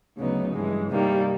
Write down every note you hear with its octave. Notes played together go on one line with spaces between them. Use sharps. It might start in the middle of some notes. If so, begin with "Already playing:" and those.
D2 C#3 F#3 B3 D#4
G2 E3 G#3
C3 D#3 G3 A#3